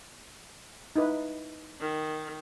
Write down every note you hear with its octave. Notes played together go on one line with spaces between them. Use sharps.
D#4 E4 B4
D#3